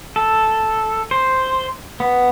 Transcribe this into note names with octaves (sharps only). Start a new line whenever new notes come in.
A4
C5
B3